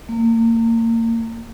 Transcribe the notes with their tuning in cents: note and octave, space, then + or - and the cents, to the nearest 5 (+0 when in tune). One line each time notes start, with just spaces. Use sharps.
A#3 -30